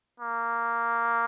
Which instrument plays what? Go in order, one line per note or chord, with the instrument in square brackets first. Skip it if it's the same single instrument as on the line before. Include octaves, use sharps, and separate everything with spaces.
[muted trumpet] A#3